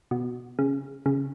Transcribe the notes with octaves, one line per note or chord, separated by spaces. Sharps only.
B2
C#3
C#3